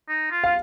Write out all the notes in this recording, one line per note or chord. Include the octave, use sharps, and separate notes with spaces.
D#4
F4
F4 F5